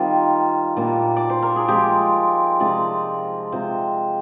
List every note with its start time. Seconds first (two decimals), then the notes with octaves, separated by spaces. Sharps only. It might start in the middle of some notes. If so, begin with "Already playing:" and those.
Already playing: D#3 G3 C4 F4
0.77 A#2 G3 A#3 D4
1.16 D5
1.30 C5
1.42 A#4
1.56 G#4
1.68 F3 G#3 C4 G4
2.60 C3 F3 G#3 C4 D5
3.52 C3 F3 G#3 C4 C5